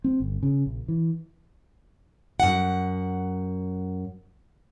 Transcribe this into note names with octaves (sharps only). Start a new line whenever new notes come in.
C4
G1
C#3
A#1
E3
F#2 F#5